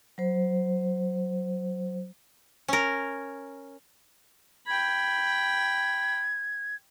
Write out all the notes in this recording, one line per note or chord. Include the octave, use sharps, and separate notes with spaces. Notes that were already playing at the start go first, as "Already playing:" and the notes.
F#3 C5
C#4 A#4
G5 B5 G#6